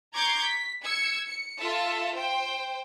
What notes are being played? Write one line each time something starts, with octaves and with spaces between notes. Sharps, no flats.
A#5 C#6 D6 G6 G#6 C7
B6
E6 G#6 C#7
C#7
F4 A4 E5 A5
C5 G5